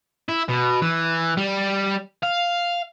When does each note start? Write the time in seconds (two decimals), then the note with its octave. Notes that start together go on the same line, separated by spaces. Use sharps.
0.29 E4
0.49 B2
0.82 E3
1.37 G3
2.23 F5